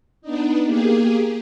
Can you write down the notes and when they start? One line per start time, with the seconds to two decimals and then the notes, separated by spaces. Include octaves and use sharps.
0.22 B3 D4 D#4
0.65 A#3 G4 G#4